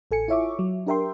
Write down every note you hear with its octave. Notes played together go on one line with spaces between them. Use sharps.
A1 A4 G#5 C#7
E4 F4 C#5 E5 C#6 D6
F#3
D4 G4 A#4 E5 G5 C6